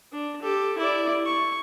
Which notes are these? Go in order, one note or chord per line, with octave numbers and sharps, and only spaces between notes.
D4
G4 A4
E4 D5
C#6